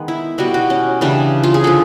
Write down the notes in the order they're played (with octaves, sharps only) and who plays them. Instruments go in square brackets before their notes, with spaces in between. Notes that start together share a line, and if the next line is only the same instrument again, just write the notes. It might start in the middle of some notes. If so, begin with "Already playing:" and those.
Already playing: [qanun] D#3 G#3 B3
E4
B2 G3 B3 F#4
F#4
C#4
C#3 E3 G3 D4
F4
G#4
D3 F3 A4